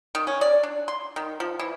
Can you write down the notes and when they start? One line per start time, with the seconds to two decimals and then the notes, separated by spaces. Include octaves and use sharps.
0.15 D#3
0.27 C#4
0.41 D5
0.63 D4
0.88 C6
1.16 D#3
1.40 F3
1.59 E3